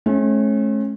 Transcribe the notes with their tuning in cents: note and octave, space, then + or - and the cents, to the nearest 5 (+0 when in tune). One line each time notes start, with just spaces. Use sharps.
A3 -40 C#4 -30